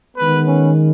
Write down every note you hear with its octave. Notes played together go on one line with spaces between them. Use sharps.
D#3 G#3 B3 B4
C#4